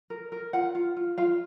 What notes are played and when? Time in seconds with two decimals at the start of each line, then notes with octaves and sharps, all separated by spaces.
0.10 A#4
0.32 A#4
0.53 F4 F#5
0.75 F4
0.97 F4
1.18 F4 F5